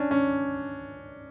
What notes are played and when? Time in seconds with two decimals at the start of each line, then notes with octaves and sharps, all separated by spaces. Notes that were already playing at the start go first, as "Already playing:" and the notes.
Already playing: C#4 D4
0.11 C#4